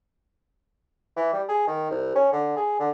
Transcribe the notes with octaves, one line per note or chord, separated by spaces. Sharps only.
E3
G3
G#4
D#3
C2
C#4
D3
G#4
D3